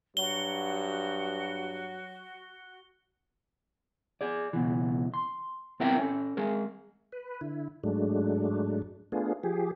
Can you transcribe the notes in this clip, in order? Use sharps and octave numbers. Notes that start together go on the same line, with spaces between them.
G2 F#3 F#4 G7
G#4 D5
C#2 B2 E3
C6
B3 C4 E4 A#4 E5 G5
C#4 A4
G#3 G#4 A#4
B4
D3 E4
G#2 F#3 G#3 A3 D4
A3 B3 D4 F4 G#4
F3 G4 G#4